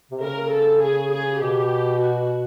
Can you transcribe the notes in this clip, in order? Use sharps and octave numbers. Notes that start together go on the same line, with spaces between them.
C3
C#3 A#4
A4
G#4
G#4
B2 G4
F#4